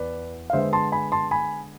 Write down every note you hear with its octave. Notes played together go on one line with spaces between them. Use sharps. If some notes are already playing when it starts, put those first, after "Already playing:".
Already playing: E2 B4 D5
F5
D3 G#3 B3 C5 E5
A5 C6
G#5 B5
A5 C6
G#5 B5